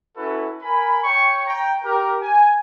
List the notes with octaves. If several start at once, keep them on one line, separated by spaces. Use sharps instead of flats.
C#4 E4 F#4 A4 B4
A#4 G#5 B5
C#5 G5 C#6
G5 A#5
G4 A#4
G#5